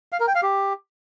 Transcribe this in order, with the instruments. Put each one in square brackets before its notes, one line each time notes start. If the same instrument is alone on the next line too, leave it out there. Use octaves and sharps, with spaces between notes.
[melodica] F5
A#4
G5
F5
G4